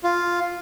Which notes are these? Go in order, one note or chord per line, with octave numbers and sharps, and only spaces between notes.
F4